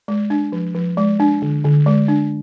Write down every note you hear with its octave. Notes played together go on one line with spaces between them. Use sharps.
G#3
D4
F3
F3
G#3
D4
D3
D3
G#3
D4